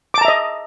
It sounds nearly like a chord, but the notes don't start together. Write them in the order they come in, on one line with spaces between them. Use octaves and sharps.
D6 A5 A#5 E5 D#5